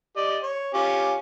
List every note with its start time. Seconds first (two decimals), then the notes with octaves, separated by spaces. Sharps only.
0.17 G4 D5 D#5
0.43 C#5
0.74 C#4 F4 G4